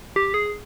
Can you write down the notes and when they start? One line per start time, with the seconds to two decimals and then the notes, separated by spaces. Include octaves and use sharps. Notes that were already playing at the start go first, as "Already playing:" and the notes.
0.16 G4
0.34 G#4